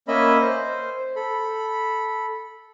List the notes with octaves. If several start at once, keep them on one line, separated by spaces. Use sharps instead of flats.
A#3 C#4 D#5 E5 B5
C5
A4 B5